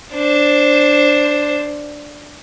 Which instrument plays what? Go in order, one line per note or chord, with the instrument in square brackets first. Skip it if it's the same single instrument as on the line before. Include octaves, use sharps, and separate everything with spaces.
[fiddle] D4 C5